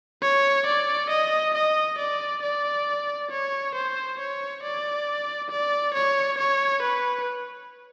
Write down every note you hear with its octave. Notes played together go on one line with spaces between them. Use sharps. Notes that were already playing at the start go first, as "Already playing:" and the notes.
C#5
D5
D#5
D#5
D5
D5
C#5
C5
C#5
D5
D5
C#5
C#5
B4